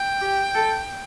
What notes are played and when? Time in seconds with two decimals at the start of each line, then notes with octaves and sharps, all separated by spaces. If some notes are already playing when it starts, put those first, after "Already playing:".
Already playing: G5
0.21 G4
0.55 A4